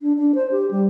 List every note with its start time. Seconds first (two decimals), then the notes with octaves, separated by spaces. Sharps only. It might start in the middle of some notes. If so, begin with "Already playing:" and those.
0.01 D4
0.18 D4
0.35 C5
0.51 G4
0.71 G3